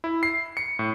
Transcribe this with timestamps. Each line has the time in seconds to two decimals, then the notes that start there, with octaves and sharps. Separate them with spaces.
0.04 E4
0.23 C7
0.57 C#7
0.79 A2